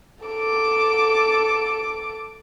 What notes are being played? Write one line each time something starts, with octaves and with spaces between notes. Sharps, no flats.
A4 D6